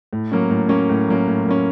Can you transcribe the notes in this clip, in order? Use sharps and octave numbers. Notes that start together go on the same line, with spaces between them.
A2
F#3 A#3 C#4
A2
F#3 A#3 C#4
A2
F#3 A#3 C#4
A2
F#3 A#3 C#4